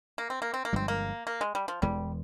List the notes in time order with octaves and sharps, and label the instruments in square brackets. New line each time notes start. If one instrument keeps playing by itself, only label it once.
[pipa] A#3
C4
A#3
C4
A#3
[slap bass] G1 G2 F3 G#3 [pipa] C4
[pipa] A#3
A#3
G#3
G3
F3
[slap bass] E1 E2 E3 G#3 [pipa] G3